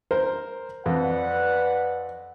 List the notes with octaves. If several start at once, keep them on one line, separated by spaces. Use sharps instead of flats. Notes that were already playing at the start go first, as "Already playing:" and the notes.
A#4 C5
F2 B4 D5 F#5